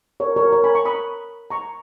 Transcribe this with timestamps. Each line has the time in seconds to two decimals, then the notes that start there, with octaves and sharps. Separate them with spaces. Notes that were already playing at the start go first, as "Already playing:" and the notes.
0.20 A#4 C#5
0.36 A#4 C#5
0.53 A#4 C#5
0.64 G#5 B5
0.75 A#5 C#6
0.85 B5 D#6
1.50 A#5 C#6